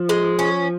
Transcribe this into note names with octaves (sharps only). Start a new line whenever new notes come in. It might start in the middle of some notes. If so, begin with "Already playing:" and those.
Already playing: F3
G#3
C#4